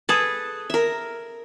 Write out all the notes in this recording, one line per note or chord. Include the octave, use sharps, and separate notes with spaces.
G#4 A4 B4
A#4 E5